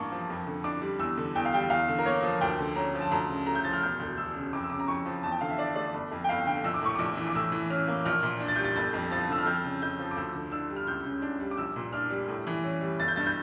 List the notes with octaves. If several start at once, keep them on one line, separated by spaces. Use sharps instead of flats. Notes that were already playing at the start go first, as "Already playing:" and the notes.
Already playing: A1 G2 A#3 A5 C#6
F3
F2
D3
D4 D6
G3
E2 E6
D3
E2 G5
F5
G3 G5
E2 F5
D3
A#4
A#3 C#5
F3
D2 G5
D3
C#4 A#5
F3
A5
D2 A#5
C#3
A3 A#5
G6
F3 A6
F6
E1 G6
D2
E1 E6
C#3
F2 D6
E6
C#3 D6
A#5
F2 C#6
F3
E2 A5
G5
D3 F5
E5
D4 D5
A3 D5
G1
F2
G5
G1 F5
D3 G5
A#1 E6
D6
A2 C#6
A#1 D6
E3
D6
A2 E6
E3
C#4 F6
A#3
A#1 F6
A#2
D4
A6
G3 G6
A6
G1 A6
F2
F3 A6
D3 E6
F6
F2 G6
C#3
F2 G6
F3
D6
D2 E6
D3
D4 E6
G3
F6
C#2 G6
C#3
D4
G3
D6
A#1 E6
A#2
D4 F6
G3
A2
E3
C#4
G3
G1 A6
G6
G2 A6
G6